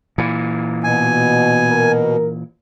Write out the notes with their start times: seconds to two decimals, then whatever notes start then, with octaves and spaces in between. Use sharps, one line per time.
0.18 A#2 E3
0.84 B2 G#5
1.69 A#4